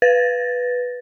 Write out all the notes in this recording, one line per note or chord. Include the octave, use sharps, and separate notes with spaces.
B4 A6 A#6